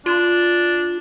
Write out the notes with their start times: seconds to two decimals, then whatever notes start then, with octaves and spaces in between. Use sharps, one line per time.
0.06 D4 F4